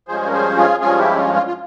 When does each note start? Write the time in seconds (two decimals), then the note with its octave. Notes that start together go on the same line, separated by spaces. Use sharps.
0.08 G2 F3 G#3 C#4 G#4 C5
0.28 A#4
0.32 G#4 C5
0.56 F4 G#4
0.80 G2 F3 G#3 C#4 F4 G#4
0.98 E4 G4
1.16 F4
1.35 F4
1.47 F4